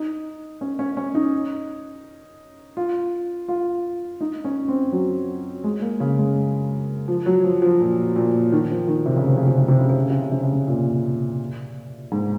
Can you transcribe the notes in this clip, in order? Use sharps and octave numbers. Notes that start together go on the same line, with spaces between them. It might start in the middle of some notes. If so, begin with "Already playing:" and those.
Already playing: D#4
C#4
C#4
C#4
D#4
F4
F4
D#4
C#4
C4
F#3
G#3
A#3
C#3
G#3
F3
F#3
F3
F3
A#2
A#2
D#3
F3
D#3
C3
C#3
C3
C#3
C3
C#3
C3
C#3
C3
C#3
C3
C#3
C3
C#3
C3
A#2
G#2